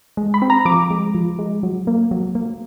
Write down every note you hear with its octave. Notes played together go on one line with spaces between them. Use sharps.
G#3
B5
C4
A#5
F3 D6
G#3
F3
G#3
F#3
A#3
F#3
A#3